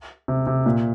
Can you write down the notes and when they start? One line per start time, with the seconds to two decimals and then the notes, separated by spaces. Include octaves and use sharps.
0.28 C3
0.47 C3
0.66 A#2